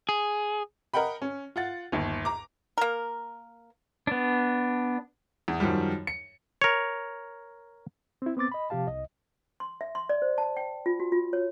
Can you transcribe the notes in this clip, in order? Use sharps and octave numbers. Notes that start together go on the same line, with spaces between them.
G#4
A#4 D#5 F#5 G5 B5
C#4
F4 F#5 A6
G1 D#2
A#5 D6
A#3 A#4
B3 D4
E2
F#2 D#3 F3 G3
C#7
A#4 C#5
C4 E4
B3 C4 D6 A6
D#5 B5
C3 F3 G4 F5 A5
C2 D#5
C6
E5
C6
D5
C5
A5
G5
F4
F#4
F4
C#5